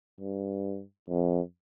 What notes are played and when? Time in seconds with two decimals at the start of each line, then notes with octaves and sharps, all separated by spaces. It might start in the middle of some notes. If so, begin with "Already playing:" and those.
0.20 G2
1.09 F2